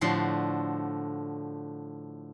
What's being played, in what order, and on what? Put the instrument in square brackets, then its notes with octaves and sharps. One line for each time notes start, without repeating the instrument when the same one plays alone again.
[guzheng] A2 D3 F3 F#4 C6